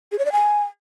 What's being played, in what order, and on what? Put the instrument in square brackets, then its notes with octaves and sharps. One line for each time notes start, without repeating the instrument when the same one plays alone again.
[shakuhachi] G#4
C#5
D5
G#5